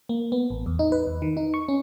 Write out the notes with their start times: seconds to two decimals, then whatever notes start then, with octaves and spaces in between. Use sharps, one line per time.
0.09 A#3
0.32 B3
0.50 A1
0.66 E2
0.79 D#4
0.92 B4
1.07 E2
1.22 D#3
1.37 D#4
1.54 C#6
1.68 C#4